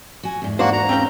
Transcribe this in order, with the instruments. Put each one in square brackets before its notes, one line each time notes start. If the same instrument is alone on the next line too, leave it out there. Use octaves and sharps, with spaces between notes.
[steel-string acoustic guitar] F#4 G#5
E2 G#2
[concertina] A#3 F#4 [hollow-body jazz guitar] D4 C5
[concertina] A#5
[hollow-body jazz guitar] C4 C#4 G5